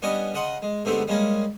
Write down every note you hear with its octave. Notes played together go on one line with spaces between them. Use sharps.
G3 B3 C#4 D4 D#5 G#5
C#3 D#5 F#5 C6
G#3
G#2 D3 A3 B3 C4 G4
G3 G#3 A#3 C#4 G#4